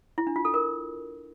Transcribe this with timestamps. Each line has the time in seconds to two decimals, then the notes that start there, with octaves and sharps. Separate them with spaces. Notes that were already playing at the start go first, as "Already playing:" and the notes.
0.18 E4
0.27 D4
0.36 F4
0.45 A4
0.54 A#4